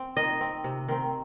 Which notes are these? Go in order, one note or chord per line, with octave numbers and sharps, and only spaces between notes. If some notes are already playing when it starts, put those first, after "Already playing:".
Already playing: C4
D#3 D#5
C4
C3
D#3 C4